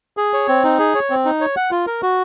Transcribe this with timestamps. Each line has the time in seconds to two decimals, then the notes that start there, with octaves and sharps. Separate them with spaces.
0.17 G#4
0.33 C#5
0.48 C4
0.64 D#4
0.79 G#4
0.95 C#5
1.10 C4
1.25 D#4
1.41 C#5
1.56 F#5
1.71 F4
1.87 A#4
2.02 F#4